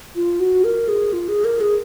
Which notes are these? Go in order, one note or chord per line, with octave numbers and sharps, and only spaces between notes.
F4
F#4
A#4
G#4
F4
G#4
A#4
G#4